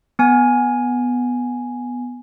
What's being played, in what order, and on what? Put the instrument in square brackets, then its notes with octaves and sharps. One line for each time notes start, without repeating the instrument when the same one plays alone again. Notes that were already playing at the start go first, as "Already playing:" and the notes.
[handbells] B3 G#5